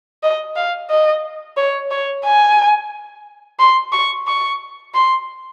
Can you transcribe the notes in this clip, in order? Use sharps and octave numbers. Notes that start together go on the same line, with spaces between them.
D#5
F5
D#5
C#5
C#5
G#5
C6
C#6
C#6
C6